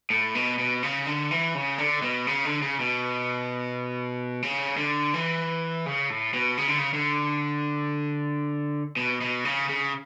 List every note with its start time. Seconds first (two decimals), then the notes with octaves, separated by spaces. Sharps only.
0.10 A2
0.35 B2
0.59 B2
0.83 C#3
1.07 D3
1.31 E3
1.55 C#3
1.78 D3
2.02 B2
2.27 C#3
2.45 D3
2.62 C#3
2.80 B2
4.42 C#3
4.77 D3
5.14 E3
5.86 C#3
6.10 A2
6.33 B2
6.57 C#3
6.68 D3
6.78 C#3
6.94 D3
8.97 B2
9.21 B2
9.45 C#3
9.69 C#3